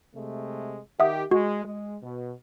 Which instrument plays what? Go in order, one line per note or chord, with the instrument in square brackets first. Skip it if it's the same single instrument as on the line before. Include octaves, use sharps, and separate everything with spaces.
[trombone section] C3 G#3 A3
[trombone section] D#3 G4 [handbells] E5 F#5 D#6
[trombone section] G#3 [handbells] F#4
[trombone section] G#3
B2